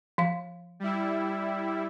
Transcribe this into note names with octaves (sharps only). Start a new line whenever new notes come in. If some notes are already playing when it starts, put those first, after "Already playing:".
F3 F5
G3 E4